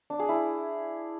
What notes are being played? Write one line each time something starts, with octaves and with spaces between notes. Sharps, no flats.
D4
G#4
E4